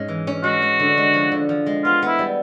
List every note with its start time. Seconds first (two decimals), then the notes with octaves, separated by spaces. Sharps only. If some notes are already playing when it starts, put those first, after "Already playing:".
Already playing: G#2 G#3 C#4
0.08 E3
0.27 C#4
0.44 G#3 F#4
0.62 G#3
0.80 D3
0.97 G#3
1.14 F3
1.32 D3
1.49 F3
1.66 G#3
1.84 B3 F4
2.02 B3
2.08 E4
2.19 G3